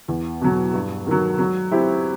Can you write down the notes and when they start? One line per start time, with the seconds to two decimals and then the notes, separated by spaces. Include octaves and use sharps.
0.08 E2
0.41 B2 F#3
0.74 G2
1.07 D#3 F#3
1.39 F#3
1.71 C4 E4 G4